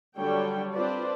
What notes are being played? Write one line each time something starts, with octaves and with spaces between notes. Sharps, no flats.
D3 F#3 G3 D4 C#5 G5
C4 D4 F4 B4 C5 D5